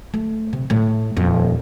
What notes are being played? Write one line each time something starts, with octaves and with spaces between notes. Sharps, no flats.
A3
C3
A2 A3
D#1 F2